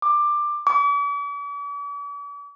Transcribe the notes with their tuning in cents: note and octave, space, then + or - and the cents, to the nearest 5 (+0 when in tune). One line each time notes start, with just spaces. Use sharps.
D6 +15
D6 -45